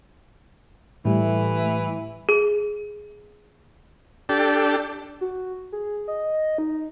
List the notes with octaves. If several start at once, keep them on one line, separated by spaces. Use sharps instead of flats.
A2 E3 G3 A3
G#4
D4 G4 A4
F#4
G#4
D#5
D#4